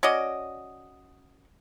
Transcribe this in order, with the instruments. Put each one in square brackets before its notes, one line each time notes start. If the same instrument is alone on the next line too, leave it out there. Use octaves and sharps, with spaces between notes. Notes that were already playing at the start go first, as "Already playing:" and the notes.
[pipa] C#4 F#4 D5 D#5